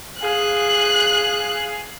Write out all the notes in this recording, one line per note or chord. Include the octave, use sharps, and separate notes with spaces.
G#4 F5 F#6